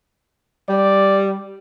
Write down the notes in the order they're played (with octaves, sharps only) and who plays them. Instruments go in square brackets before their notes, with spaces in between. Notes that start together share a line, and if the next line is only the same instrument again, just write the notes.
[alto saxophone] G3 [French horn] D5